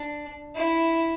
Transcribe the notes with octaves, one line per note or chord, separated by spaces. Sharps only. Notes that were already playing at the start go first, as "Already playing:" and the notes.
Already playing: D4
E4